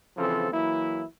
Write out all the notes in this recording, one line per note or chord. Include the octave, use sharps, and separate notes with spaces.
C#3 E3 F3 C4 A4
E3 F#3 A#3 E4